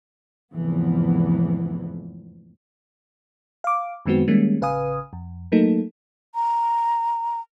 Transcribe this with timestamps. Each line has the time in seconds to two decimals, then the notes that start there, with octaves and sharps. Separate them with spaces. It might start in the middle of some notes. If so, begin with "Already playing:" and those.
0.53 F1 E2 G#2 E3 F3 B3
3.64 F5 D6
4.06 F#2 D#3 G#3 B3 C4 F#4
4.28 D#3 G3 G#3 A#3 C#4
4.61 A1 C#3 B4 F5 G#5 D#6
5.13 F2
5.52 F#3 A3 A#3 D#4 A4
6.35 A#5